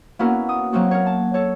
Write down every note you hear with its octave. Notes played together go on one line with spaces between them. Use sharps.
A#3 B3 C#4 E4 F#4 A#4
D#6
F#3 A#3 C4 F#4
A#4 C#5
A5
A4 C#5